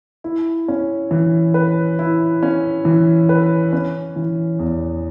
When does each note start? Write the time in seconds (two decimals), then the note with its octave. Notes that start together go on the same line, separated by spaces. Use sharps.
0.24 E4
0.68 C#4
1.11 E3
1.54 B4
1.99 E4
2.43 C#4
2.85 E3
3.29 B4
3.72 C#4
4.16 E3
4.59 E2